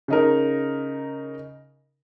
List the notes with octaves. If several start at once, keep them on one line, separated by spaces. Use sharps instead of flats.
C#3 D#4 A#4